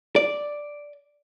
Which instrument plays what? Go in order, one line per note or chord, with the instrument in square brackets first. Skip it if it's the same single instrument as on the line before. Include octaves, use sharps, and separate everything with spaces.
[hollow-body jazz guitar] D5